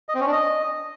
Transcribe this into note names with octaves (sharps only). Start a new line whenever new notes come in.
D#5
C4
C#4
D4
D#5